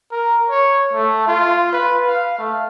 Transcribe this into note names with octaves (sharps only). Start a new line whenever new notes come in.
A#4
C#5
A3
F4
B4
F5
A3